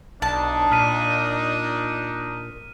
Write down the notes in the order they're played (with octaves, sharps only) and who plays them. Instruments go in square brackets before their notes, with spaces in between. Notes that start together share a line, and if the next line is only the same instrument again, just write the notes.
[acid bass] B1 [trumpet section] D4 D#4 [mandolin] A5
[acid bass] A#2 [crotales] F6 B6 D#7